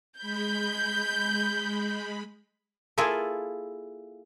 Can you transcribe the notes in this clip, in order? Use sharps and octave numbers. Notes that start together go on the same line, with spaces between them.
G#3 B5 G6
A#3 E4 F4 G#4 A4